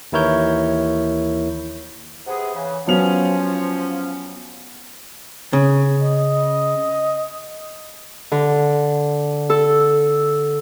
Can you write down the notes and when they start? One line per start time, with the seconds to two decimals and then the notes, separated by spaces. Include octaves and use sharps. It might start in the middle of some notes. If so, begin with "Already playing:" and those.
0.12 D#2 E3 E4 A#4 C#5 G6
2.26 C3 B3 G#4
2.55 C#3 E3
2.87 F3 F#3 B3 C#4 F7
5.53 C#3
6.02 D#5
8.32 D3
9.50 A4